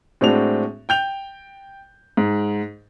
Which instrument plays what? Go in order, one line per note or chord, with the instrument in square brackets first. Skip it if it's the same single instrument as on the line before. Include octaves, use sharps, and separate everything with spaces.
[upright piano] A2 G#3 C4 D4 F#4 F7
G5 G6 F7
G#2